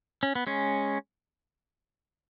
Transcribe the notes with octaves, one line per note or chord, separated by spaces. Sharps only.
C#4
B3
G#3 C#4